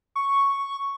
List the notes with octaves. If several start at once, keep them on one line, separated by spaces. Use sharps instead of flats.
C#6